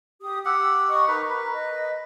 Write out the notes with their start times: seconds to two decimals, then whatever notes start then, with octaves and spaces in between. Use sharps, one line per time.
0.22 G4 D#6
0.45 G4 F#5 E6
0.88 D#5 C#6 D#6
1.07 D#4 A#4 B4 A#5
1.30 B4
1.52 D#5